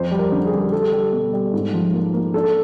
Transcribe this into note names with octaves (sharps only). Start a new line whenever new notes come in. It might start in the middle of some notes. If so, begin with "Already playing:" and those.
Already playing: F2 C5
G3
A#4
D3
G#4
G3
G3 A4
G3
B2
G3
G#2
F3
A#3
A#3
D4 A4